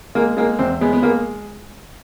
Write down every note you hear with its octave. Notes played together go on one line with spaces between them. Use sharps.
G#3 A#3
G#3 A#3
E2 C4
G#3 B3
B3
G#3 A#3